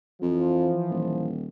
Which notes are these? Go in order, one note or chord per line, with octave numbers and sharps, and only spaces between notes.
F2 E3 F3
D#1